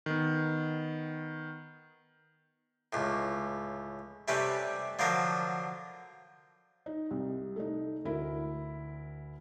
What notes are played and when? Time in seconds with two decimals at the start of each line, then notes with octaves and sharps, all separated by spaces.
0.06 D#3 B3
2.93 C#2 A2
4.28 C3 G3 A3 C#4 B4
4.99 D3 F3 F#3 F4 A#4
6.86 D#4
7.11 C2
7.56 A3 D#4
8.05 D2 E4 A#4